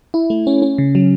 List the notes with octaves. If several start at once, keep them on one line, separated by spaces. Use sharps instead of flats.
E4
A3
C#4
C#4
C#3
F#3